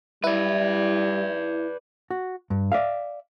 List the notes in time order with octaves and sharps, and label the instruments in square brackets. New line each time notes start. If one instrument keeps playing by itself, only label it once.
[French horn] G3 [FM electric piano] E4 [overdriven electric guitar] B4 D5
[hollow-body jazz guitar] F#4
G2
D5 E5 F5